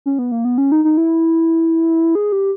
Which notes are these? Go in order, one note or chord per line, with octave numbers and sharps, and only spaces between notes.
C#4
B3
A#3
B3
C#4
D#4
D#4
E4
G#4
G4